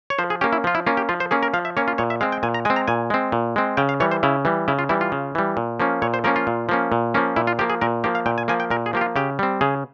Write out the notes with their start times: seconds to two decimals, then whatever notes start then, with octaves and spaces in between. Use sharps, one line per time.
0.10 C#5
0.19 F3 C5
0.30 G#4
0.41 A#3 C#4 G4
0.53 E4
0.64 F3 F4
0.75 E4
0.87 A#3 C#4 F4
0.97 G4
1.09 F3 F4
1.20 C5
1.31 A#3 C#4 G#4
1.43 A#4
1.54 F3 F5
1.65 E5
1.77 A#3 C#4 C#5
1.88 F4
1.98 A#2 C#5
2.10 E5
2.21 G#3 C4 F5
2.32 G5
2.43 A#2 G#5
2.54 A#5
2.65 G#3 C4 G#5
2.76 A#5
2.88 A#2 G#5
3.10 G#3 C4
3.32 A#2
3.56 G#3 C4
3.77 C#3 G5
3.89 F5
4.00 E3 G3 C#5
4.11 C5
4.23 C#3 E4
4.45 E3 G3
4.68 C#3 E4
4.79 F4
4.89 E3 G3 E4
5.01 F4
5.12 C#3
5.35 E3 G3
5.57 A#2
5.80 F3 A#3 C#4
6.02 A#2 C#5
6.14 C5
6.24 F3 A#3 C#4 A#4
6.36 F4
6.47 A#2
6.69 F3 A#3 C#4
6.92 A#2
7.14 F3 A#3 C#4
7.36 A#2 E4
7.47 F4
7.59 F3 A#3 G4
7.70 G#4
7.81 A#2 A#4
8.04 F3 A#3 G4
8.15 F5
8.26 A#2 G5
8.38 G#5
8.48 F3 A#3 G#5
8.60 G5
8.70 A#2 A#4
8.86 G#4
8.93 F3 A#3 G4
9.01 F4
9.16 C#3 G4
9.39 G3 C4
9.61 C#3 G#4